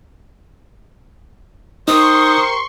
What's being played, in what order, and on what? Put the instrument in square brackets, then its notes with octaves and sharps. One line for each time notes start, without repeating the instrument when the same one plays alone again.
[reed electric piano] D#4 [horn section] G4 A#4 C5 [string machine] C6 C#6 [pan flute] D#6